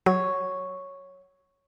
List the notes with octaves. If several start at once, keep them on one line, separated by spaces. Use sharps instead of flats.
F#3 C#5